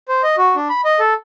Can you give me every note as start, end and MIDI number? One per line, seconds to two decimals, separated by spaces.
0.08 0.22 72
0.23 0.36 75
0.38 0.55 66
0.56 0.68 62
0.69 0.81 83
0.85 0.99 75
1.00 1.14 69